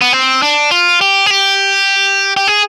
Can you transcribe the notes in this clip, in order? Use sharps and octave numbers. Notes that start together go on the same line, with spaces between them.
B3
C4
D4
F4
G4
G#4
G4
G4
G#4